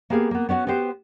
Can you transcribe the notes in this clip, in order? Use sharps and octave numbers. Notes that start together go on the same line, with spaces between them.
A#3 B3 G4 G#4 F5
A#3 B3
B3 C#4 D4 F#4
B3 F#4 G4 C5